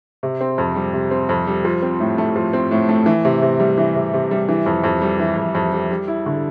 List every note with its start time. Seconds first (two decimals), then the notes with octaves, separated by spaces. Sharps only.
0.23 C3
0.41 C4
0.58 F2
0.75 G3
0.94 C3
1.11 C4
1.29 F2
1.47 G3
1.65 F3
1.82 C4
2.00 A2
2.18 A3
2.36 F3
2.53 C4
2.71 A2
2.89 A3
3.06 E3
3.25 C3
3.42 C3
3.60 G3
3.78 E3
3.96 C3
4.14 C3
4.31 G3
4.49 E3
4.66 F2
4.84 F2
5.02 G3
5.19 E3
5.37 F2
5.55 F2
5.72 G3
5.91 G3
6.08 E4
6.26 D3